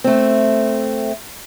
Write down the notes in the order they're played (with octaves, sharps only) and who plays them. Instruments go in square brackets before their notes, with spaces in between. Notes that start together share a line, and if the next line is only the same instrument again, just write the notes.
[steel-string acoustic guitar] A3 C4